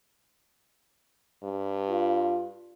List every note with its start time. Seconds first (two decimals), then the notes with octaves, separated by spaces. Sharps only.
1.43 G2
1.90 F4